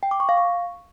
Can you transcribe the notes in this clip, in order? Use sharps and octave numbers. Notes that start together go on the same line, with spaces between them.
G5
D6
C#6
F5
C#6